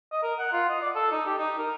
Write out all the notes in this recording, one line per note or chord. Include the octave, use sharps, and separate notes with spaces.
D#5
A#4
F#5
F4
D#5
D5
A4
D#4
G4
D#4
A#4